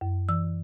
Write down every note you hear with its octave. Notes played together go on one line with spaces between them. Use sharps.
F#2
E3 E6